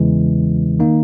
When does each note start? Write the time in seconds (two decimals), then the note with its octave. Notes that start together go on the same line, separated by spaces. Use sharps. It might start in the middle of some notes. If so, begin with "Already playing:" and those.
Already playing: E2 C#3 E3 G#3
0.79 D#3 A#3 D#4